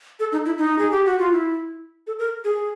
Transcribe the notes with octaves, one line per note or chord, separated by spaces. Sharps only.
A4
D#4
E4
D#4
G#4
G4
F#4
F4
E4
A4
A#4
G#4